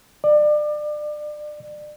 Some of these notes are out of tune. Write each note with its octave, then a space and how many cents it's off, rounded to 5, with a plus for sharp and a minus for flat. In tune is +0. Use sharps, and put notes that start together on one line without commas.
D5 +30